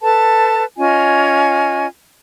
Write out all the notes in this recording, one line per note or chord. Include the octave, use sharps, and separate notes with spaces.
A4 B4 A5
C#4 F4 D#5 G#5